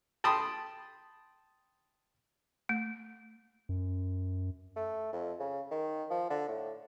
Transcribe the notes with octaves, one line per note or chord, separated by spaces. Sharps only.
G5 A5 B5 C6 D#6
A3
F#2
A3
F2
C#3
D#3
F3
D3
A2